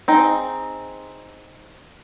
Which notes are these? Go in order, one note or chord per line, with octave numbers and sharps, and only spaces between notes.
C4 D#4 G#4 G5